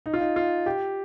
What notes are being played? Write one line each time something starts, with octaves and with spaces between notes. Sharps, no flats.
D#4
F4
D#4
F4
G4